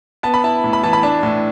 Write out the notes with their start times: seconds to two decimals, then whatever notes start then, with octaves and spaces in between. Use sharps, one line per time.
0.23 B3 A5
0.34 B5
0.44 E4 A5
0.64 A2
0.73 B5
0.83 E3 A5
0.93 B5
1.03 D4 A5
1.23 A2